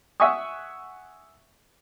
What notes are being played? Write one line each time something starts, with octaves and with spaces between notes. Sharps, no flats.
E5 F#5 G#5 C#6 D#6